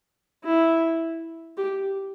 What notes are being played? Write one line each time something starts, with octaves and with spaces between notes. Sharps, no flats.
E4
G4